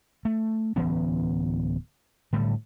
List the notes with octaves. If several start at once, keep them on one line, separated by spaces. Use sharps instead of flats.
A3
D1 E3 B3 C#4
A2 D3 G3